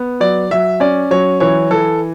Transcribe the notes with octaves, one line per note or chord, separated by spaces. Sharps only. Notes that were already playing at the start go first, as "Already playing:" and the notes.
Already playing: B3
F#3 D5
F#3 E5
C#4 D5
F#3 C#5
E3 C#5
E3 A4